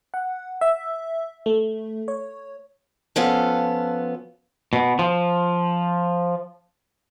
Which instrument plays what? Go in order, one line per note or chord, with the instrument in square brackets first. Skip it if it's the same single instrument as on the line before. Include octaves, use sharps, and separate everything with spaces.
[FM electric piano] F#5
E5
A3
C#5
[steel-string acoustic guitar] F3 B3 C#4 F4 A4 F5
[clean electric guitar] B2
F3